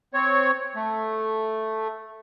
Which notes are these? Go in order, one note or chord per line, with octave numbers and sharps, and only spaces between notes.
C4 C#5
A3